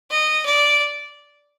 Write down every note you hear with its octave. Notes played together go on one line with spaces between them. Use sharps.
D#5
D5